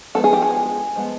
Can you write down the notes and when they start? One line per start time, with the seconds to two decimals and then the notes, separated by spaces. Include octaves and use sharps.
0.15 F3 G#3 B3 A4
0.24 G#4
0.33 G4
0.42 G#4
0.95 F3 G#3 B3